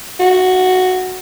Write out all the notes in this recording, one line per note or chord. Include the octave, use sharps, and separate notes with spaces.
F#4